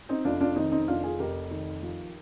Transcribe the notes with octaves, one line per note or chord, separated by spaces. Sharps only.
C4 D#4
F1 D4 F4
D4 F4
D#3 C4 D#4
C4 D#4
F1 D4 F4
F4 G#4
F1 G4 A#4
D#3
F3